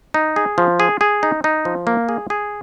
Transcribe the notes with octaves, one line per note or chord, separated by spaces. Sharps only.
D#4
G#4
F3
G#4
G#4
D#4
D#4
F3
A#3
G#4
G#4